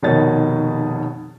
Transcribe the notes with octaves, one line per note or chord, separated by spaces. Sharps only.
F1 B2 D#3 D#4 C#5 A6